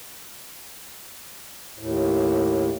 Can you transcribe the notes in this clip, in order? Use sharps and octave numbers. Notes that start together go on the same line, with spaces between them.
D#2 A2